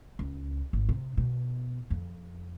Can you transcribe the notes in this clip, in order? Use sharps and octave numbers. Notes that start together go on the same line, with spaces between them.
C#2
G#1
C3
B2
F2